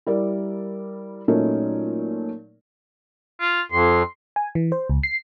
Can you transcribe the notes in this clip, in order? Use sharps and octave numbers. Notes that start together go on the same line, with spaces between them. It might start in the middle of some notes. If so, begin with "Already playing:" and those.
G3 E4 A#4 D5
A#2 F#3 A3 C#4 D#4 A#4
F4
F2 C6
G#5
E3
C5
C#2
C7